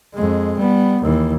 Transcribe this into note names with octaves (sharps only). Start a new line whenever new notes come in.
F2 G#3
G3 B3
D#2 E3